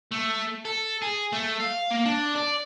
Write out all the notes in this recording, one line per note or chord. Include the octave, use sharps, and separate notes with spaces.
A3
A4
G#4
A3
F5
A#3
D4
D5